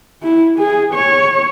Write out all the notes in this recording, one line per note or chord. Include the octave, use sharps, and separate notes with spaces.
E4
G#4
C#5